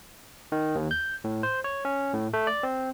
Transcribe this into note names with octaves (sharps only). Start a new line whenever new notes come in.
D#3
D#2
G6
A2
C5
C#5
C#4
A2
A3
D5
C4